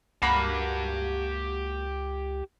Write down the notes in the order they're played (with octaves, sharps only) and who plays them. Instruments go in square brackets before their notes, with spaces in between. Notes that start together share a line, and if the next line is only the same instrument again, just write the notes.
[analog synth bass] C#2 [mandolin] A#3 F#4 B5 [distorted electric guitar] G4 A5